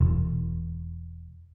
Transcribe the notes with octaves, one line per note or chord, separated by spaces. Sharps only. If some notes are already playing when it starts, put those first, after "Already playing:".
E1